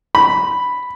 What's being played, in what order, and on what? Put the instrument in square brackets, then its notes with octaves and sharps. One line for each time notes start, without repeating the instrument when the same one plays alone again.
[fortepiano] B5